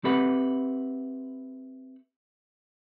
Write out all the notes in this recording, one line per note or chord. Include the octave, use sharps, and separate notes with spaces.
C4 G4 A4 B4 E5 F#5